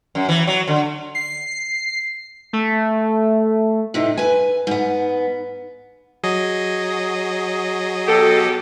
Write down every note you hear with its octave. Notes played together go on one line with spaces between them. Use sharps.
F#2
E3
F#3
D3
C7
A3
A2 C3 D#4
B4 G#5
G#2 B3
F#3 G#4 D#5
B2 G4 A4